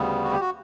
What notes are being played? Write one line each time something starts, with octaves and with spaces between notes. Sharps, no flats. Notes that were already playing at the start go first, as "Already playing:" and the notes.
Already playing: D2 C#3 G3 B3
F#4
G4
F#4